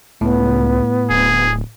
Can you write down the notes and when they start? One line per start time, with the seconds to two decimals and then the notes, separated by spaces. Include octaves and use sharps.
0.21 C#2 A2 B3
1.10 D1 G#4